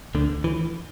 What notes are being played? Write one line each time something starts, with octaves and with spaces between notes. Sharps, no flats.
D2 D3
E3